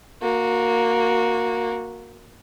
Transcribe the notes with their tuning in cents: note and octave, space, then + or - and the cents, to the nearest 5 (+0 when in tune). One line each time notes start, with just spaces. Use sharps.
A#3 +0 F#4 -15